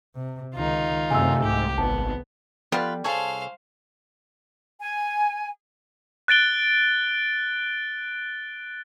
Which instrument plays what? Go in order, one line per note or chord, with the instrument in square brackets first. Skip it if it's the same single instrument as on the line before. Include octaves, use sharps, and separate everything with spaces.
[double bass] C3
[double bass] C#2 D#3 [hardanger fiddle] D#4 F4
[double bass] F#2 A3 [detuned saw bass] C3 [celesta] G#5 E6
[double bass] C2 [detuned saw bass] G#2 [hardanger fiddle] G4
[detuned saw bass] G#1 [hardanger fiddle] B3 [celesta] A5
[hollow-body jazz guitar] F3 B3 A4 [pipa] G3 [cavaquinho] F4 B4
[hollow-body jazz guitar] C2 A5 [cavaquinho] G#4 A4 C#5 [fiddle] C5 F5
[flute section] G#5
[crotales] F#6 A6 D7 G7